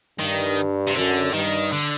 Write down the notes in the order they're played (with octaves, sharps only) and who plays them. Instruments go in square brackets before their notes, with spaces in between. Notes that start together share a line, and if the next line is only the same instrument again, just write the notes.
[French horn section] G2 [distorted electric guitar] D#3
[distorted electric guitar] C3
[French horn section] F#2 [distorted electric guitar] D3
[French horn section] G2 [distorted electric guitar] D#3
[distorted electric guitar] D3